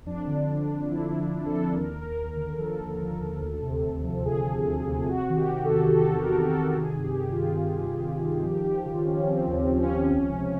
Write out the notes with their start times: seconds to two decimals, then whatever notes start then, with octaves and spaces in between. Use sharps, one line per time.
0.06 F2 D4
0.27 D3
0.48 F2
0.70 F2
0.90 F3 E4
1.11 F2
1.33 D3
1.46 A4
1.52 F2
1.73 D#2 A#4
1.95 D#2
2.02 A#4
2.16 D#2
2.30 A#4
2.37 D3
2.58 F3 A4
2.79 D3
3.00 F3
3.20 D#2
3.41 D2
3.62 C3
3.83 D2
4.04 F3
4.25 D2 G#4
4.46 D2
4.66 D2
4.87 C3
5.08 C3 F#4
5.30 D#3
5.36 G4
5.50 C3
5.64 A4
5.71 E2
5.92 E2 A4
6.13 E2
6.20 A#4
6.34 C3
6.48 A4
6.55 C3
6.76 D#3 G#4
6.97 G2
7.04 G4
7.18 D#3
7.32 F4
7.38 G2
7.59 G2
7.81 G2
8.01 G2
8.22 D#3
8.43 F3 G4
8.64 F3 G4
8.85 C#3 F4
9.06 F3 C#4
9.27 F3 C4
9.47 D#2
9.54 C4
9.69 F3
9.83 C#4
9.90 F3
10.11 C#2
10.31 C3